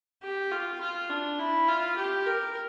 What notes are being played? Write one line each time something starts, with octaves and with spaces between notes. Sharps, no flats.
G4
F4
F4
D4
E4
F4
G4
A#4